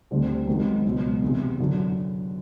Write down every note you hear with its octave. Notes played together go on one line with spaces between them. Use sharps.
D2 D3 G3 C4
G#1 G#2 D#3 F#3 B3
C#2 B2 F#3
E2 C3 E3
F#2 D3 F#3